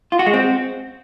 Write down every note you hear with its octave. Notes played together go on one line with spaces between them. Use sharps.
F4
F#4
G#3
C4